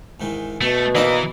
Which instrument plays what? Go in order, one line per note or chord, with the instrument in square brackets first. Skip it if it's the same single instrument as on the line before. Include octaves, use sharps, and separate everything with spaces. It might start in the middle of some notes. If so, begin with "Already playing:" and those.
[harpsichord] G#2 D#3 E3
[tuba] B2 [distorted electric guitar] A3 [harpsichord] B3
[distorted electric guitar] E3 [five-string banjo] A#3 D#4 D#5 [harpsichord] C4 D5 D6